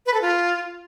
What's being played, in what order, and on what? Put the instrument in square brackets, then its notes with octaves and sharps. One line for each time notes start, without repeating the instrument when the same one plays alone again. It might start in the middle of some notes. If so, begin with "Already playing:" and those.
[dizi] B4
A4
F4